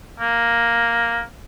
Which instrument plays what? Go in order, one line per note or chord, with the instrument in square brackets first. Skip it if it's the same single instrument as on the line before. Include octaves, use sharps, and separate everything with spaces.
[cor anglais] A#3